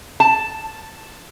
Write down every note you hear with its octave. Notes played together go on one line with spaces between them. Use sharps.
A5